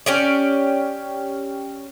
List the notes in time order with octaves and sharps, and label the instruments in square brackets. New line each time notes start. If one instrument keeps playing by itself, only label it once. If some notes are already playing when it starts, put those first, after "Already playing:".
[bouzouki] C#4 G4 D5